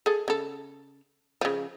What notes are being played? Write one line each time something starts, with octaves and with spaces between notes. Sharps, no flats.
G#4 A4
C#3 A4
C#3 F3